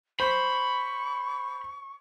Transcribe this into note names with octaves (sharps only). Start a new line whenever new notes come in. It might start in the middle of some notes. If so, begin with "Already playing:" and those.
C5 B5 C#6